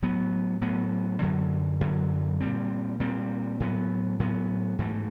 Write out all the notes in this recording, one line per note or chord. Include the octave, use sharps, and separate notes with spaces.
A2 F#3 B3
A2 F#3 B3
F#2 D3 F#3
F#2 D3 F#3
A#2 G3 C4
A#2 G3 C4
A2 F#3 B3
A2 F#3 B3
G#2 E3 A3